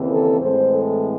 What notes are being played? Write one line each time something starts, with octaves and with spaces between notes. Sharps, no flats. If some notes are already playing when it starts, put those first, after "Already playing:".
Already playing: D#2 C#3 E3 C4
A4
A2 E3 G#3 C4 C5
A4